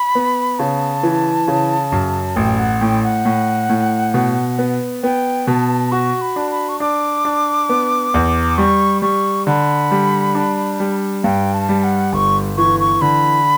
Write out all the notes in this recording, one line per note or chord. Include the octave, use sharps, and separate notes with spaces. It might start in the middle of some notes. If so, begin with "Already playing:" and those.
Already playing: B5
B3
C#3 A5
E3
C#3
F#2
A1 G5
F#5
A2 G5
F#5
A2
A2
B2
B3
B3 G5
B2 A5
F#4 C#6
B5
D4
B5
C#6
D4 D6
D4
B3
E2
G3 C#6
G3 C#6
D3 B5
G3
D4
G3
G2 G5
A5
G3
F#5
G1 C#6
E3 C#6
C#6
D3 B5